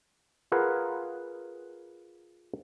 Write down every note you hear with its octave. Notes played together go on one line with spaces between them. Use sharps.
F4 G#4 A#4 B4 F5 F#5